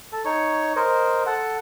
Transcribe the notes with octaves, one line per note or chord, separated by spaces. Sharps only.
A4
D#4 C#5 C#6
A#4 C5 D#5
A4 F#5